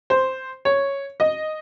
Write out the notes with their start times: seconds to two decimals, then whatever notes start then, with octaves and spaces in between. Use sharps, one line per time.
0.10 C5
0.65 C#5
1.20 D#5